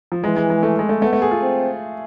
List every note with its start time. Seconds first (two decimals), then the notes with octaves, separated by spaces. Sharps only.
0.12 F3
0.24 E3 G#3
0.36 G#3
0.50 G#3
0.63 A3
0.79 G#3
0.89 A3
1.02 A3 B3
1.13 A3
1.22 G#4
1.31 F4
1.42 C4